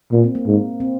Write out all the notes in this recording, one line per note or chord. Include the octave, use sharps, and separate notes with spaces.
A#2 A#3
C4
A#3
G#2
C4